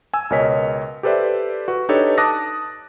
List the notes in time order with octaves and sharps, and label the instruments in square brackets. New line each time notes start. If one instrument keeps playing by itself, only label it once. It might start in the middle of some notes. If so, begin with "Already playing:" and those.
[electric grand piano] G#5 E6
C#2 B2 A#4 C#5 D#5 B6
G4 A4 B4 C5 D5 E5
F#4 B4
D4 D#4 G4 A4 B4 C#5
A5 D6 D#6 F#6 A6 A#6